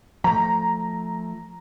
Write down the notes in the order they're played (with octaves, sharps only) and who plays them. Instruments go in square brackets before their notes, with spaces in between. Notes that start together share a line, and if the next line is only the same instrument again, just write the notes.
[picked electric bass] F3 A3 [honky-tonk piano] A#5